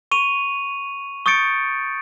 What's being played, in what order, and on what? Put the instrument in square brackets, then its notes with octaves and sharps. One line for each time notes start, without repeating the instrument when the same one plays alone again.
[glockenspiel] C#6 D#7 F7
C#6 D#6 G6 A6 C#7 D7